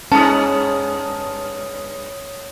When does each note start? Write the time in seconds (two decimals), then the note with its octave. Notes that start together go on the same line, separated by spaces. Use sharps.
0.12 G2 G#3 B3 C#4 C#5 A5 D#6